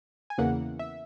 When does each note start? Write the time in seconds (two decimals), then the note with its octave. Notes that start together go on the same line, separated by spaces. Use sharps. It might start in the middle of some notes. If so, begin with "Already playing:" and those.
0.30 G#5
0.38 E2 C#3 E3 A#3 F#5
0.79 E5